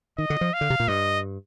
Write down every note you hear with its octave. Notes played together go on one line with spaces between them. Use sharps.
D#3 D#5
D3
F3
F5
D3
C3
A#2
G2 D#5